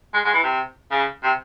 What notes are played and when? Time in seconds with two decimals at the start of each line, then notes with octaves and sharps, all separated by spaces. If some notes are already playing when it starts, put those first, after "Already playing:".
0.14 G#3
0.25 G#3
0.34 E3
0.44 C3
0.91 C#3
1.23 C3